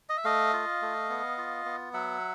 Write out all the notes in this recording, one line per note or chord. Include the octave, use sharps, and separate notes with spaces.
D#5
E5
A3 D#5 F5
F4
A3
B3
F4
B3
F#3 E5 F#5